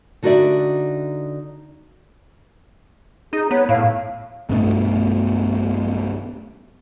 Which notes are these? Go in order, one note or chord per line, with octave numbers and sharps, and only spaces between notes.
D3 D#4 F#4 B4 D5 E5
D#4 G#4
B3 C#5
A2 F5
B1 G2 B2 A3